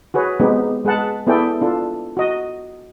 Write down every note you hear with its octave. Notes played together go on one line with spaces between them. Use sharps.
F#4 G#4 B4 C#5
G#3 B3 C4 D#4 G4
G#3 G#4 B4 F#5 A5
B3 E4 G#4 A4 D5 G5
D4 F4 A4
F#4 D#5